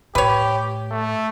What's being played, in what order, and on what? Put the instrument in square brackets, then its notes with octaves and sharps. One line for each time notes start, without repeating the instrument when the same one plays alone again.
[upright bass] A2 [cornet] G4 [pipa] B4 C#5
[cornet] A3